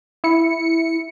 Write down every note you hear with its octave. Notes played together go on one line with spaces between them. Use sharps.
E4 C#7